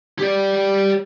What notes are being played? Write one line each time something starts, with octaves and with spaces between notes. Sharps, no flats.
G4 D5